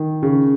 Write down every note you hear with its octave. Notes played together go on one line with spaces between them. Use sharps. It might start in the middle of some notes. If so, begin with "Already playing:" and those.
Already playing: D#3
C#3